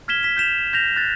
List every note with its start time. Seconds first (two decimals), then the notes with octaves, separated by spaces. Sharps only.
0.08 F6 G#6 B6 E7 G7
0.23 B6 E7
0.37 G6 B6 E7 F7
0.73 G6 A#6 F7
0.96 F#6 A6